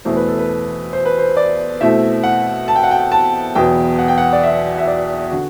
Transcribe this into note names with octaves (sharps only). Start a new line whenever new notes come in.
E2 B2 A3 E4 C5
B4
A4
B4
C5
B4
C5
D5
B2 A3 C4 E4 E5
F#5
A5
G5
F#5
G5
A5
E2 B2 F#3 B3 G5
F#5
G5
F#5
D5
E5
E5
D5
D3 F#4